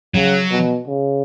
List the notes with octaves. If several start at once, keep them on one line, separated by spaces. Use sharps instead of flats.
C#3 F#3
B2
C#3